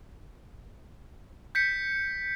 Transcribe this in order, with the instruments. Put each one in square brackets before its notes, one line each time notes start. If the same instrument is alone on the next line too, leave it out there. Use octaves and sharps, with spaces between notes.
[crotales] G6 B6 C#7